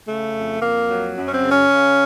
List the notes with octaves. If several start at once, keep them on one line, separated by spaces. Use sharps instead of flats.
C#3 A3
F2
F2 A#3
F#3
F#2
C#4
C4
C#3
C#4
C#3